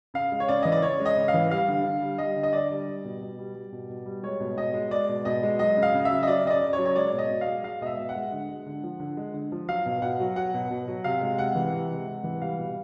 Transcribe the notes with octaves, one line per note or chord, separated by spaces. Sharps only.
C#3 F5
G#3
C#5
C#3 D5
E3 D#5
D5
C#3 C#5
G#3
D#5
C#3
F5
E3
G3 F5
D3
D3
G3
G3 D#5
D3
D#5
D3 D5
G3
G3
B2
B2
G3
G3
B2
B2
G3
G#3 C#5
B2
B2 D#5
G#3
G#3 D5
B2
B2 D#5
G#3
F#3 D#5
C#3
F5
C#3
E5
F#3
D#5
F#3 D5
C#3 D#5
D5
C#3
C#5
F#3
C#5
G#3 D5
B2
D#5
B2
F5
G#3
G#3 F5
B2 D#5
E5
B2
F#5
G#3
D3
G#3
D3
F3
D3
G#3
D3
F3
F#3 F5
B2
B2 F#5
F#3
F#3 F#5
B2
B2
F#3
C3 F5
G#3
C3 F#5
E3
C3
G#3
C3
E3
G3 F5
B2